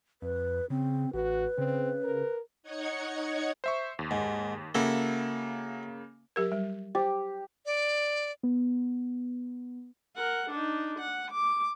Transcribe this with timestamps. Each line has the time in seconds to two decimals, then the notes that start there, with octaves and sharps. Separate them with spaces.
0.22 F2 B4
0.70 C#3 C4
1.14 A1 F#4 B4
1.58 C#3 C4
2.04 A#4
2.63 D#4 C#5 D#5 F#5 G#6 C#7
3.64 C5 E5 C#6
3.99 D#2
4.11 G#2
4.75 C#3 A#3 E4 F#4 A4
6.36 F#3 G4 A#4
6.52 G3
6.95 G4 C5
7.66 D5
8.43 B3
10.16 A#4 F#5
10.50 D4 D#4
10.99 F#5
11.31 D6